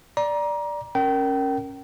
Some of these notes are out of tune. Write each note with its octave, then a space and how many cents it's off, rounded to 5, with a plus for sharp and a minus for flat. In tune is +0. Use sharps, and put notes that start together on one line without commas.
D5 +0 A#5 +25
C#4 -10 A#4 -5 G5 -30